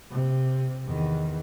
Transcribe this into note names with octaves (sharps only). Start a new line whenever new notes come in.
C3
E2 D#3